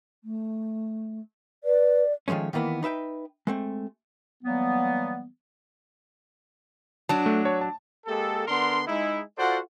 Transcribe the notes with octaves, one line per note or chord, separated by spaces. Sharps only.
A3
B4 D5
D#3 F3 G#3 A3 C#4
D#3 E3 A#3 B3 E4
D#4 B4 E5 G5
G#3 A3 C4
E3 F#3 G3 A#3 B3
F#3 D4 A5
A3
C#5 A5
A5
G#3 A#3 G4 A4
D3 B3 D4 A#4 C6
G#3 D#4 E4
F4 F#4 A4 C5 D5 F#5